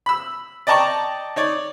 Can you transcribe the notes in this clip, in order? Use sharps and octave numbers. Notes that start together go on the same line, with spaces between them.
B5 E6
D5 D#5 G5 A5 A#5 C#6
D#4 C#5 D5